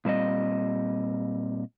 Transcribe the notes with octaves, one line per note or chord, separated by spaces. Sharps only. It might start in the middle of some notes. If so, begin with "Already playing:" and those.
A#2 G3 C4 D#5